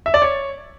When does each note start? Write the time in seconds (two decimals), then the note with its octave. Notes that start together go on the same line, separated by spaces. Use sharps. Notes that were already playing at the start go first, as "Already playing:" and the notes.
0.06 E5
0.14 D5
0.22 C#5